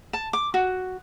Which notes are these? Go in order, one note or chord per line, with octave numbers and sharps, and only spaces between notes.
A5
D6
F#4